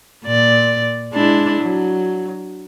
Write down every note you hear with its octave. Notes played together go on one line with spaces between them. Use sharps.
A#2 D5
G#3 D4 E4
F#3